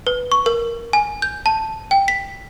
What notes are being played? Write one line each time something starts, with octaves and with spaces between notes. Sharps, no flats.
B4
C#6
A#4
G#5
G6
A5
G5
B6